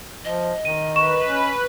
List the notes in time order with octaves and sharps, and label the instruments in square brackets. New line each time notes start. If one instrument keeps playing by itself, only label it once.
[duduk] F3 [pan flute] D#5
[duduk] D#3 [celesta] D#7
[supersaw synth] B4 [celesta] C#6 E7
[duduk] C#4